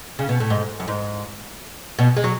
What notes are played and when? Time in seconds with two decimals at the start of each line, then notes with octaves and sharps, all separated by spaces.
0.19 C#3
0.29 B2
0.40 A2
0.50 G#2
0.80 F#2
0.88 G#2
1.99 B2
2.17 G#3
2.24 F#3